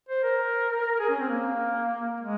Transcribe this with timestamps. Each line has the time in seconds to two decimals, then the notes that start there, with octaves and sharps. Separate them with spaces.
0.09 C5
0.23 A#4
0.95 A#4
0.99 G#4
1.09 C#4
1.19 C4
1.29 A#3
2.20 G#3